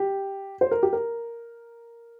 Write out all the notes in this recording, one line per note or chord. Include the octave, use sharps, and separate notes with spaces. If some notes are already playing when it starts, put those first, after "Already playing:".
Already playing: G4
C5
A#4
G4
A#4